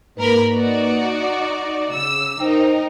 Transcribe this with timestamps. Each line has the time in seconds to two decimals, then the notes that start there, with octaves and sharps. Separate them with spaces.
0.17 G#2 A#3 A#4 B4 B5
0.51 D#4 F#4 D5
1.23 D6
1.92 C#3 E6
2.40 D#4 A#4 C5 G5